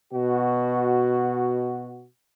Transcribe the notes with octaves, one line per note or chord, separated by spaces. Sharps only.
B2 F#4